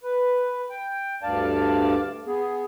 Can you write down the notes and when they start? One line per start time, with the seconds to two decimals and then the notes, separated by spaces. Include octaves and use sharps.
0.03 B4
0.70 G5
1.22 D2 G2 D5 F5 A5
2.27 B3 G#4